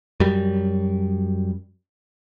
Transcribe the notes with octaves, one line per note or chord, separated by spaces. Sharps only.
F#2 G3